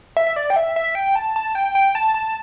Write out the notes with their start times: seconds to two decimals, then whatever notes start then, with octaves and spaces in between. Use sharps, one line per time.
0.17 E5
0.27 E5
0.36 D5
0.50 G5
0.56 E5
0.76 E5
0.95 G5
1.16 A5
1.36 A5
1.55 G5
1.75 G5
1.95 A5
2.14 A5